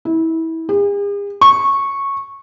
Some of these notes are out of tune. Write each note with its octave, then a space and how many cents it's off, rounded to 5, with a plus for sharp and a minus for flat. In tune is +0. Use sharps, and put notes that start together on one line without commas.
E4 -25
G#4 -45
C#6 -10